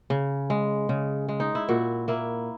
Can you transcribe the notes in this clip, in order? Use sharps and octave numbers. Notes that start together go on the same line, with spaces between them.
C#3
G#3
C#3
G#3
D#4
E4
A#2 F#4
A#3 E4